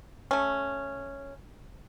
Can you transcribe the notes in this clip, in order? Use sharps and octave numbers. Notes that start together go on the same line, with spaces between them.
A3 C#4